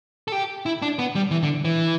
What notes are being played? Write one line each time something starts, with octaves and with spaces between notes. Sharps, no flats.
A4
G4
E4
D4
B3
G3
E3
D3
E3